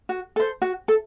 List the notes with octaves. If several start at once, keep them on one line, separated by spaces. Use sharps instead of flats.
F#4
A4 C5
F#4
A4